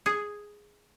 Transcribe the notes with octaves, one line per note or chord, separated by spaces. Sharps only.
G#4